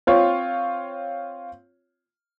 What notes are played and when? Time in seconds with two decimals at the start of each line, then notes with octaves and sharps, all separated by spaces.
0.07 C4 F4 C#5